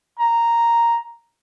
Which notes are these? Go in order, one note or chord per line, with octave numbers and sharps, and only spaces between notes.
A#5